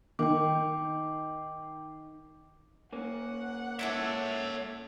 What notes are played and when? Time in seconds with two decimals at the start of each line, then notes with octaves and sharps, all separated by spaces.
0.19 D#3 G5 D6
2.93 A#3 C#4 F#5
3.79 E4 A4 C#5 E5 D6